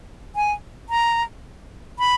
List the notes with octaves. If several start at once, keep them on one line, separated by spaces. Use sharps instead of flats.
G#5
A#5
B5